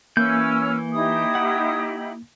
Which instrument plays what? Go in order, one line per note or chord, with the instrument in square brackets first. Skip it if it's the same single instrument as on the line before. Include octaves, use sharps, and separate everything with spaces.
[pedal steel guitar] E3 G6 [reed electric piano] A#3 [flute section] C#4 E6 F6
[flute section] D#4 E4 G4 [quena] D#6
[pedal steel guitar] F#5